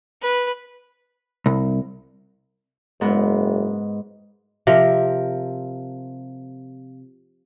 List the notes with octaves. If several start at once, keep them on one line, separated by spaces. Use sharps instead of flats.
B4
C2
F#1 G#2 B3
C3 F3 A#4